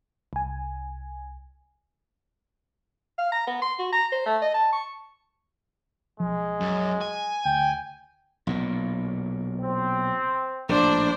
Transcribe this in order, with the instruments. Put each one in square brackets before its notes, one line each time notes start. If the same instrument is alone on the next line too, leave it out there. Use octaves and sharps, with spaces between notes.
[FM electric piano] C2 G#5
[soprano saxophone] F5
A#5
B3
C6
F#4
A#5
C5
A3
D#5
A5
C#6
[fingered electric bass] B1 F3 [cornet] G#3
[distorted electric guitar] F#2
G#5
[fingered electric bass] D2 [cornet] G5
[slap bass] B1 A#2
[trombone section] C4
[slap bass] A#1 A2 [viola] D4 C5